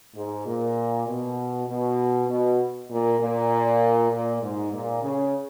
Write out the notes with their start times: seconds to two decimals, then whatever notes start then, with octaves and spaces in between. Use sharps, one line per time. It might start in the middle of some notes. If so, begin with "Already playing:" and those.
0.15 G#2
0.46 A#2
1.07 B2
1.67 B2
2.28 B2
2.90 A#2
3.19 A#2
4.11 A#2
4.41 G#2
4.72 A#2
5.03 C#3